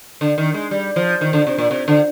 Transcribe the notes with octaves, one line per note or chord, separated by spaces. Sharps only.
D3
D#3
G#3
G3
F3
D#3
D3
C3
A#2
C3
D3